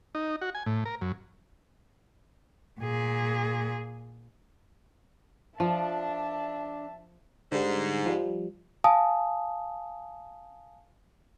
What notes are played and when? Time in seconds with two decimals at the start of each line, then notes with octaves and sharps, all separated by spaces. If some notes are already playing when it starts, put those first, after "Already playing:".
0.15 D#4
0.41 F#4
0.55 G#5
0.66 A2
0.85 A#4
1.01 F#2
2.80 A#2 G#4
5.60 F3 D4 E5 A5
7.52 G#2 D3 G3
8.06 F3 G3
8.84 F5 G#5 A5 D#6